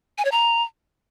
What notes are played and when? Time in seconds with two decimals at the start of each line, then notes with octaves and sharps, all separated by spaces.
0.18 G#5
0.25 C#5
0.32 A#5